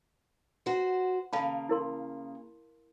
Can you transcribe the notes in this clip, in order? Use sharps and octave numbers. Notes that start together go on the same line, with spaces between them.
F#4 C5
C#3 A#3 F5 A5 B5
E4 A#4 C6